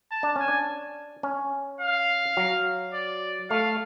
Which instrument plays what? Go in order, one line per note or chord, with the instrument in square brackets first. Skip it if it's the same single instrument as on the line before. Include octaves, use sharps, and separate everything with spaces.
[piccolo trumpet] A5
[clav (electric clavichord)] D4
[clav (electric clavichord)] C#4 [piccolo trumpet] G#5
[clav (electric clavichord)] D4
C#4
[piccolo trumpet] F5
[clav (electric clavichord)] F#3
[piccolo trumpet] D5
[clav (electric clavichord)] A3 [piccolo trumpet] F5